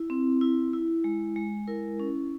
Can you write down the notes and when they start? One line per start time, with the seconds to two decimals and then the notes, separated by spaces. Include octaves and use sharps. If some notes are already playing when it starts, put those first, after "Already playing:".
Already playing: E4
0.10 C4
0.41 E4
0.73 E4
1.04 G#3
1.36 G#3
1.68 E4 A#4
1.99 C#4